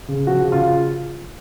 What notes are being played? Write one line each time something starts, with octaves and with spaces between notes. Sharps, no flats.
C#3
F3 F#4
C#3
F4